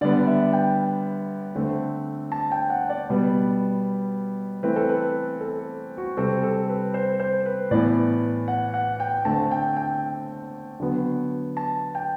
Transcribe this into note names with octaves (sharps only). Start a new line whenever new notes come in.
D3 G3 B3 D5
E5
G5
D3 A3 C4
A5
G5
F#5
D5
B2 G3 B3
E3 A3 C4 B4
A4
B4
A4
F#4
C3 G3 C4 A4
A4
B4
C5
C5
B4
A2 E3 B3 D5
F#5
F#5
G5
D3 A3 C4 A5
G5
G5
D3 F#3 B3
A5
G5